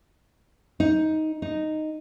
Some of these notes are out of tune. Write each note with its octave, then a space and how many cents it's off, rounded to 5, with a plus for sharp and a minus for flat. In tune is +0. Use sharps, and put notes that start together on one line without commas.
D#4 +10
D#4 -5